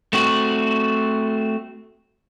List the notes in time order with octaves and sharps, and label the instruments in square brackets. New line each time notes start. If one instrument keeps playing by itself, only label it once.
[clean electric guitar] A3 C4 F#4